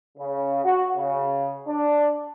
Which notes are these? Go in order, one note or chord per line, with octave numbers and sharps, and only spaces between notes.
C#3
F#4
C#3
D4